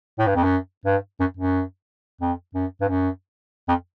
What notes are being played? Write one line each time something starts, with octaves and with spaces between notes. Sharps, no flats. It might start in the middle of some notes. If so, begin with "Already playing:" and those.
A2
G2
F2
F#2
G2
F#2
F#2
F2
F#2
G2
F#2
F2